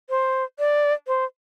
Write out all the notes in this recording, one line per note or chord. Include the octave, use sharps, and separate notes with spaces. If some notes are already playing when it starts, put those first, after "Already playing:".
C5
D5
C5